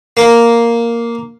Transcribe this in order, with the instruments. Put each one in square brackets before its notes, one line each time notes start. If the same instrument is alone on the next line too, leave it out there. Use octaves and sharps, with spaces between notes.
[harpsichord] A#3